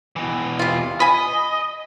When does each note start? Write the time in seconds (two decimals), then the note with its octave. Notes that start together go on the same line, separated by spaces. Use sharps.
0.16 B2 E3
0.59 C3 F4
1.00 D#5 G#5 B5